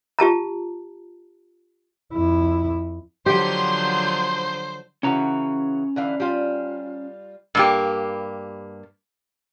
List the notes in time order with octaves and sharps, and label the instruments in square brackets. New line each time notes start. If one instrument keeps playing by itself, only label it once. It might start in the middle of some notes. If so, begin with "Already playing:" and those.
[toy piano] F4 G4 A5 A#5
[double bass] F2 E4
[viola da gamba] D3 F3 F#3 [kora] G4 [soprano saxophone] C5 [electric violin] C6 G6
[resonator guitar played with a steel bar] C#3 E3 F#4 [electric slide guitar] C#4 A#5
[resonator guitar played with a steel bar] D3 E3 F5
G3 F4
G2 A#3 G4